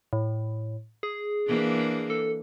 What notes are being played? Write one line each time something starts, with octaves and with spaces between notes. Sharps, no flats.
A2
G#4
E3 A#3 D4
A4